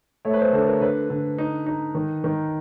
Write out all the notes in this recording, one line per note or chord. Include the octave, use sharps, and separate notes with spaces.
A3 C#5
B4
C5
D3 A4
A#4
D3 B4
D3
D#4
D#4
D#3
D#3